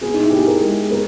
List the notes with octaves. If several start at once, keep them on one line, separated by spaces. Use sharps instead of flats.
B3 G#4
D#4
E4
B3 G4
G#4
A#4
G#3
B3 A#4